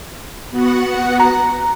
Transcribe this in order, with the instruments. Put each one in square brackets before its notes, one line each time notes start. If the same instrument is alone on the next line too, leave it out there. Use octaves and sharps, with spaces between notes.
[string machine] B3 F#4 F#5
[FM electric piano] A#5